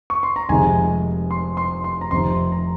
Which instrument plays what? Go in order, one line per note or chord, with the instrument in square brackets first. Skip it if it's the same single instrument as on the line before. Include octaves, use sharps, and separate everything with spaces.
[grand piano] C#6
C6
A#5
F1 F2 C3 D#3 G#3 G#5
C6
C6
C6
A#5
F1 F2 C3 D#3 C6
A#5